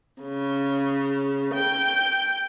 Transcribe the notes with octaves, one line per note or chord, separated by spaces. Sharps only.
C#3
G5